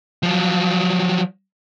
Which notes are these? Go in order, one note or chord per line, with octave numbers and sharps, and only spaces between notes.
F3 F#3